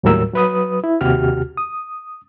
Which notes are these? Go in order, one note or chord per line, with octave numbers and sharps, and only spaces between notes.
D#2 A2 F#3 G3 A#4 E6
F#3 B4 D#6
E4
D#2 C3 F#4 G4 F6
D#6